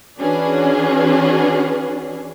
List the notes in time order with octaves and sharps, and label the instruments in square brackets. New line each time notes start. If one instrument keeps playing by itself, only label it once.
[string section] E3 C#4 D4 F#4 G#4 B4